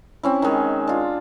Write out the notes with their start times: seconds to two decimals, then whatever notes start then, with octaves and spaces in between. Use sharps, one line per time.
0.23 C4 C#4 E4
0.42 D#3 G#3
0.87 D4 F4